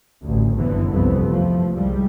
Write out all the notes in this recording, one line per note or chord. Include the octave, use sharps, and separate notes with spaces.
A1 D2
G1 F#2 D3 E3 B3
C2 F2 B3 C4
F3 A3
C2 G3 G#3